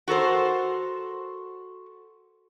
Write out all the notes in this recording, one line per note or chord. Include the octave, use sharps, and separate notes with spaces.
F#4 A4 A#4 C5